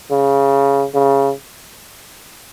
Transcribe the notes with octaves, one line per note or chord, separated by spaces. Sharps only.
C#3
C#3